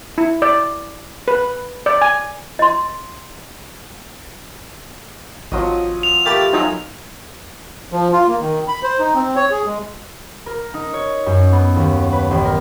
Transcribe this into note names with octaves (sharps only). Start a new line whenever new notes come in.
E4
D5
B4
D5
G#5
D#5 C6
G#1 F3 F#3 D#5
F7
A3 A#3 G4 B5 A6
F3 F#3 D#4 G#5 E6
F3
F4
A#3
D#3
B5
C5
D#4
C4
C#5
G#4
G#3
A#4
D#4
C#5
F#2
B3
D#2
B4
A1
A#4